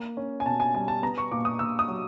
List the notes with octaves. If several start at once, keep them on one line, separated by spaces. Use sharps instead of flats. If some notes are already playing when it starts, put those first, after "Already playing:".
Already playing: A#3
C#4
G#5
B2 A5
G#5
G3 G#5
A5
B3 A#5
C#6
A#2 D6
D#6
A#2 E6
D#6
F#3